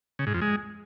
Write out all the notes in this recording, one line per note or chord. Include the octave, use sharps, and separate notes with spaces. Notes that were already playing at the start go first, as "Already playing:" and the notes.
C#3
G#2
F2
G#3